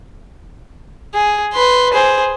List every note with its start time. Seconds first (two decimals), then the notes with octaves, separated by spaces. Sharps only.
1.14 G#4
1.54 B4 C6
1.94 G#4 C5